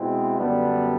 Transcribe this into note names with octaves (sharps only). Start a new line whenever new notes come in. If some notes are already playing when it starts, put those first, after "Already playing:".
Already playing: B2 G#3 C4 E4
F#2 D3 G3 B3 D4